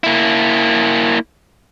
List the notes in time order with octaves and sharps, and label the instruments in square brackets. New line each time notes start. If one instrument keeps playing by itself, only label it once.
[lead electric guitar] A#3 E4